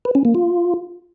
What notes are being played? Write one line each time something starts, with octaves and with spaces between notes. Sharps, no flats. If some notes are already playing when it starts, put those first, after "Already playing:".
B4
C#4
A#3
F4